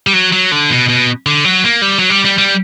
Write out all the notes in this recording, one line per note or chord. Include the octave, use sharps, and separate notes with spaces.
G3
F#3
F#3
D3
B2
B2
D3
F#3
A#3
G3
F#3
G3
G3
G3